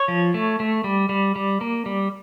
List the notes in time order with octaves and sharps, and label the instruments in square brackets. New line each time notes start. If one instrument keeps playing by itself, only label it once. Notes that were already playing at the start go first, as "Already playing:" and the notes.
Already playing: [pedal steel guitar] C#5
F3
A3
A3
G3
G3
G3
A#3
G3